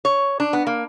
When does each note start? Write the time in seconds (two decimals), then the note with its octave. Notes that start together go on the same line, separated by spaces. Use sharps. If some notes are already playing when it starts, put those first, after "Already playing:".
0.05 C#5
0.40 D4
0.53 B3
0.67 A#3